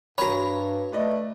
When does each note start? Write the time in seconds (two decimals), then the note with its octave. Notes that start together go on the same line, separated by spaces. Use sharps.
0.18 G2 F#4 C#5 A#5 B5
0.92 A3 B4 D5 D#5